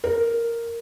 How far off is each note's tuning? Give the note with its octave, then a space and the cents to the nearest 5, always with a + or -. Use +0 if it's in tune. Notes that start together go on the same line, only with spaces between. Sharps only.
A#4 -5